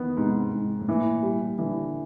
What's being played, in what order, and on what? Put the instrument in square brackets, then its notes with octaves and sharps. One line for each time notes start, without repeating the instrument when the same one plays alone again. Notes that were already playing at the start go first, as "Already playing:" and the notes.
Already playing: [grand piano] D#3 E3 [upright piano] B3
[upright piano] G#2 [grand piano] C3
[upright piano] G#2
[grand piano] A2
[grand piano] A#2 [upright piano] E3
[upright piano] G3
[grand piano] D3 [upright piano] E3